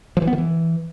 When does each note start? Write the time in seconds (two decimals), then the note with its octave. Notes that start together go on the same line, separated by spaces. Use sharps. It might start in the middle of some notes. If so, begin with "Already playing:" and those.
0.17 F3
0.22 E3
0.27 B3
0.33 D#3
0.38 E3